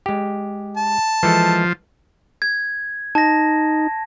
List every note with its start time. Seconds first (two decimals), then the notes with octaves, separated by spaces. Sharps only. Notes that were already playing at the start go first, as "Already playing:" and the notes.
0.06 G#3 G4
0.77 A5
1.23 E3 F3 G#3 A4
2.42 G#6
3.15 D#4 A5 A#6